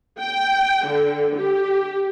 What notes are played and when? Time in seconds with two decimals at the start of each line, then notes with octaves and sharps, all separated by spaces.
0.20 G5
0.86 D3
1.37 G4